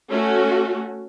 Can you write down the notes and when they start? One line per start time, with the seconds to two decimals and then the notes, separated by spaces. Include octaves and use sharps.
0.11 A3 C#4 F#4